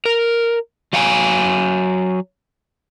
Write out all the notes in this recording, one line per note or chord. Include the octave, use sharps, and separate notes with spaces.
A#4
F#3 F5 G5 G#5